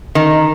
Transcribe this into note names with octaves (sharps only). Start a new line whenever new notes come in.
D#3